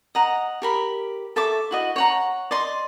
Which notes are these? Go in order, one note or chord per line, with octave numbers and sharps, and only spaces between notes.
D#5 F#5 A#5
G4 A#4 B5
A4 E5 C#6 D6
E4 F#4 D#5
C#5 F#5 A#5
D5 D#5 C6